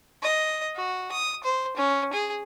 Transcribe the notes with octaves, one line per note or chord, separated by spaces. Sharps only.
D#5
F#4
D#6
C5
C#4
G#4